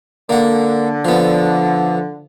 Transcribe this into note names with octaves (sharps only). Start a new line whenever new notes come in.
D3 A#3 F#5
F3 B3